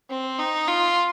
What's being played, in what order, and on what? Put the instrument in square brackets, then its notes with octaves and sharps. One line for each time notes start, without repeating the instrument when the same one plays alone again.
[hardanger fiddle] C4
D#4
F4